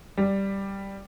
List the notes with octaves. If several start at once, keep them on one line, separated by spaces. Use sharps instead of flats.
G3